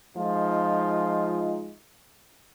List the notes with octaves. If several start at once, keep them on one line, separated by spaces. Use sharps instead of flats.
F3 G#3 D#4 F4